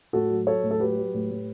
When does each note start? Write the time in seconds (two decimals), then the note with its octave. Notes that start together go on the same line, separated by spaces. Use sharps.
0.13 A2 F#4 A4
0.30 F#3
0.47 F#3 A4 C#5
0.63 A2
0.71 A4
0.80 F#3 G4 B4
0.98 F#3
1.14 A2
1.31 A2